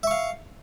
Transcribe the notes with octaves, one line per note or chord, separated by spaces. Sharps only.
E5 F5 C#6